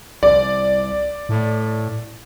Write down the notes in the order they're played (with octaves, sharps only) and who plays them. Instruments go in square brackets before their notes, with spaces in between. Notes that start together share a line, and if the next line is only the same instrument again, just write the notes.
[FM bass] C2 [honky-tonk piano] D5
[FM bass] A2